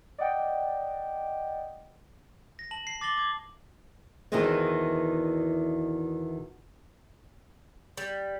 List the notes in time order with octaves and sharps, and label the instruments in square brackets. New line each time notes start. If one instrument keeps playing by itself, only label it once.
[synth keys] D5 D#5 F#5 G5
[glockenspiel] A#6
A5 F#7
C7
D6 A6 A#6 F#7 G7
D6 G#6
[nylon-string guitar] E2 B2 D#3 E3 G#3 C4
[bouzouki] G3